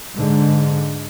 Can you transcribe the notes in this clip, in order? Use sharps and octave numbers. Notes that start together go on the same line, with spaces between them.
G#2 D3